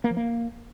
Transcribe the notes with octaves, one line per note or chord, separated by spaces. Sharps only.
A#3
F3
A#3